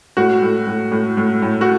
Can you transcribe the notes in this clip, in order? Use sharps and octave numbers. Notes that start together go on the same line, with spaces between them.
A2 F#4
A2
A2
A2
A2
A2
F#4